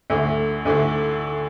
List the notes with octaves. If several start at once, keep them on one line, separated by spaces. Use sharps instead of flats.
D2 D3 A3
D2 D3 A3